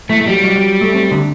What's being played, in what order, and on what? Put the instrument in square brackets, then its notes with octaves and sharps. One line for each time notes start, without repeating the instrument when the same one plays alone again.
[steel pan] E3 [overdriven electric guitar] A3
[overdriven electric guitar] A3
[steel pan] F#3 [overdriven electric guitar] G3
[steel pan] F#3
F#3
A3
C4
D3 D4